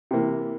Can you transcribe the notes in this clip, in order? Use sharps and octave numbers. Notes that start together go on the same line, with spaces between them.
C3 E3 A#3